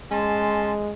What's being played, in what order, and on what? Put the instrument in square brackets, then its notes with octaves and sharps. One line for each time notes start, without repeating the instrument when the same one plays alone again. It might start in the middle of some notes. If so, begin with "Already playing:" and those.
[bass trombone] G#3 [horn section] C#4 A5 C6